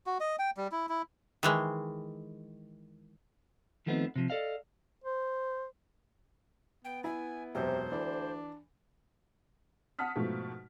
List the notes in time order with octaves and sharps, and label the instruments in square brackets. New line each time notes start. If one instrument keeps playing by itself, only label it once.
[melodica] F#4
D#5
G5
G3
E4
E4
[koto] D#3 E3 G#3
[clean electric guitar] D#3 F3 A3 B3 C4 D#4
C3 F3
A4 D5 D#5 F5
[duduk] C5
[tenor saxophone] B3 [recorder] G5
[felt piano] E4 [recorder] G#5
[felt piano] E1 F#2 [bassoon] C3 [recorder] C5
[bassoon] D2 [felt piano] E3 [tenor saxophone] D4
[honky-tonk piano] F#5 A5 D#6 F6 B6
G#2 B2 F3 A3